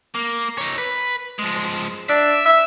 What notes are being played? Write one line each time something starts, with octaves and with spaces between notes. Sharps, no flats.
A#3
D#4 C#5
B4
F3 G#3
D4 E5
E5